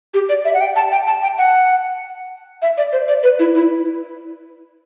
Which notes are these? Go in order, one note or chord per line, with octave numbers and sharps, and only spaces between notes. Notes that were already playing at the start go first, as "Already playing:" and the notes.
G4
D5
E5
F#5
G5
A5
G5
A5
G5
F#5
E5
D5
C5
D5
B4
E4
E4